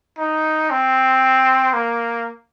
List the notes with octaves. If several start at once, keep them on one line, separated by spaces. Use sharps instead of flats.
D#4
C4
A#3